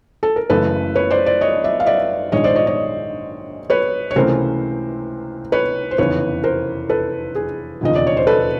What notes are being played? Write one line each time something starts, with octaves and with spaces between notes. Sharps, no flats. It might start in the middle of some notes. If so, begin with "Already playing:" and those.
A4
A#4
F#1 F#2 C#3 E3 A3 A4 B4
B4 C#5
C5 D5
C5 D5
C#5 D#5
D5 E5
F5
D5 E5
A#1 G#2 D#3 G#3 C#5 D#5
C5 D5
C#5 D#5
C#5 D#5
B4 C#5
C#5
C#2 C3 E3 A3 C#4 A#4 C5
B4 C#5
C5
F1 E2 C#3 B4 C#5
A#4 C5
A4 B4
G#4
E1 D#2 C#3 F3 D#5
D5
C#5
C5
A4 B4